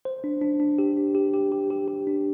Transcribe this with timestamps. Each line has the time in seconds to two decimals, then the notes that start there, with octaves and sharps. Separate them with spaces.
0.05 C5
0.24 D4
0.42 D4
0.60 D4
0.79 G4
0.97 D4
1.15 G4
1.33 G4
1.52 G4
1.70 G4
1.88 G4
2.07 D4